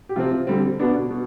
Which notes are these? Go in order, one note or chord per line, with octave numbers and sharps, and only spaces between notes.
G4
C3 F3 C4 F4
D3 G3 C4
B2 B3 D4
B2